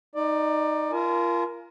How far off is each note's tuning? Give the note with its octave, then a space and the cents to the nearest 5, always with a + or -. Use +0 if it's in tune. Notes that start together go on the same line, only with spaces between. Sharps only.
D#4 +0 D5 +20
F4 -25 A#4 +10 G#5 +45